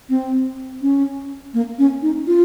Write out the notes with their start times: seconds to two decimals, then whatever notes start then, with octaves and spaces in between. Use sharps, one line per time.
0.09 C4
0.82 C#4
1.54 A#3
1.79 C#4
2.02 D#4
2.27 F4